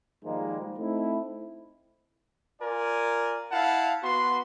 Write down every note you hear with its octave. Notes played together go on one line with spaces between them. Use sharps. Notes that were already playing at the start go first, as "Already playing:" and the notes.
G#2 D#3 F3 G3 G#3 A#3
A3 C4 D#4 E4
F4 A#4 D5 G#5
E4 F5 F#5 A5
B3 F#4 B4 C6